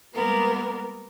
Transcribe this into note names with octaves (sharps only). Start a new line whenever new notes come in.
G3 G#3 A#3 B3 A#4